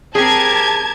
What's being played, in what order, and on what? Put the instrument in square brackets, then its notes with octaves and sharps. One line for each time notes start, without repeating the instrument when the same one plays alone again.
[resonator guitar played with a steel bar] C4 G#4 [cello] G4 A#4 [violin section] A5 G#6